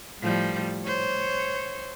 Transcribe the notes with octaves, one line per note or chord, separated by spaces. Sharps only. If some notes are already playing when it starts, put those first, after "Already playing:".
A2 F3 G3
C5 C#5